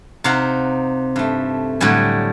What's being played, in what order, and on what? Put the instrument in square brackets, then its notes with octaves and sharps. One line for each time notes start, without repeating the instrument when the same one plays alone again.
[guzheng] C3 D#4 F5 F#5 A#5
G2 A3
A2 D3 F#3 G3 G#5